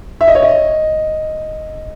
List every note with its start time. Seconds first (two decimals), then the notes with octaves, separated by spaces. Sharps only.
0.21 E5
0.28 D#5
0.35 C#5
0.42 D#5